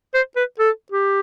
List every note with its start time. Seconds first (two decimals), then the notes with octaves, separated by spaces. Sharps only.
0.14 C5
0.36 B4
0.60 A4
0.92 G4